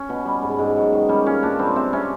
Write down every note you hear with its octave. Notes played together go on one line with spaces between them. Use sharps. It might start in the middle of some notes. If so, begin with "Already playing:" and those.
Already playing: C#4
B2
G3
G#2
G#2
F#3
D#3
G3 C#4
A#2 C#4
A#2 D4
G3 C4
C3 C4
C3 C#4